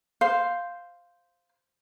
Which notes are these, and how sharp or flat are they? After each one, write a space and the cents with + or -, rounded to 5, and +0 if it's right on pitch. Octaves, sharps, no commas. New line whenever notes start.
C5 -5 F5 +0